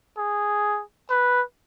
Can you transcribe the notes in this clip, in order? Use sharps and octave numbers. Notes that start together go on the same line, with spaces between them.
G#4
B4